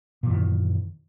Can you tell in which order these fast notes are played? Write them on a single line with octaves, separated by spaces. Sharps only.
A#2 E3 F#2 D#3